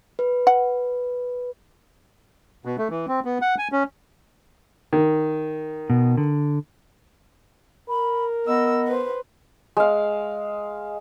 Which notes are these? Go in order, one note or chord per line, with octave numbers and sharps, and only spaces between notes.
B4
F#5
B2
A3
E3
C4
B3
F#5
G#5
C#4
D#3
B2
D3
A#4 B5
B3 D#5 E6
B4 C5
G#3 F5